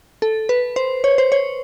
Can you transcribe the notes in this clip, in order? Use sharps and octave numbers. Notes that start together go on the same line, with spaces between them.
A4
B4
C5
C#5
C5
C#5